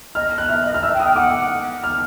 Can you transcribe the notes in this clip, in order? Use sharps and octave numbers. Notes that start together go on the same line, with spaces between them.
D#5 F6
F#6
E5 F6
D#5
F6
E5 E6
G5
D#6
G5
F#5 D6
F6